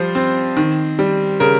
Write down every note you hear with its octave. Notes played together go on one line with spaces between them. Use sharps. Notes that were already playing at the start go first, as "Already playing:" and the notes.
Already playing: F3 G3 C5
C4
D#3
G3
C#3 A#4